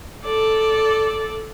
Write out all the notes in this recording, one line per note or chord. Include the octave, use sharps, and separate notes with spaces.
A4 D5